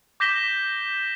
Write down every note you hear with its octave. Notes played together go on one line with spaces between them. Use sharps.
D6 G6 A#6 B6 E7 G7